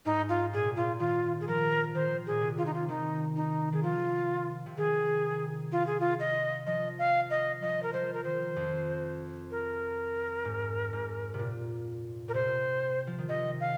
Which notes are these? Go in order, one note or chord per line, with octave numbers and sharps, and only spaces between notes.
G#2 D#4
F4
A#2 G#4
C3
A#2 F4
D#3 F4
G#4
F3 A#4
D#3 C5
A#2 G#4
C3
F4
D#4
F4
D#3 D#4
D#4
D#3 G#4
F3 F4
C3
D#3 G#4
F4
G#4
F4
D#5
F3 D#5
F5
D#5
F3 D#5
A#4
F3 C5
A#4
D#3 C5
F2
A#4
G#2
G#2
C3
A#2
A#2 A#4
C3 C5
F3
D#3
C3 D#5
F5